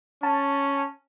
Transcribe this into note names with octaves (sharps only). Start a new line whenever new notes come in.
C#4 A5